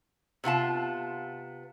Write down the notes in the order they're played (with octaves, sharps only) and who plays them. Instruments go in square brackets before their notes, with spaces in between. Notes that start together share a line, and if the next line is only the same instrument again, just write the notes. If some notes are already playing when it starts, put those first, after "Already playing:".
[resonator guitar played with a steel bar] C3 B3 F4 A5